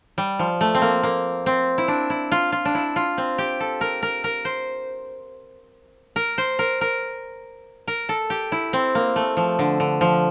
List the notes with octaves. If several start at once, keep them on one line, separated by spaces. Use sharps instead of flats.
G3
F3
A3
C4
A#3
A#3
C4
E4
D4
E4
F4
F4
D4
E4
F4
C4
G4
A4
A#4
A#4
A#4
C5
A#4
C5
A#4
A#4
A#4
A4
G4
E4
C4
A#3
A3
F3
D3
D3
F3